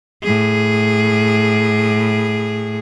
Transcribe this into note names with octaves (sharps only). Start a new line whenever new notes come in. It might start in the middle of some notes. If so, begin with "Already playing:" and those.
A2 G#4